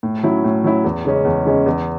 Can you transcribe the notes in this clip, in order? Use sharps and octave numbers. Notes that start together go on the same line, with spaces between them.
A2
F#3 C#4 E4
A2
F#3 C#4 E4
E2
C#3 G#3 C#4
E2
C#3 G#3 C#4
E2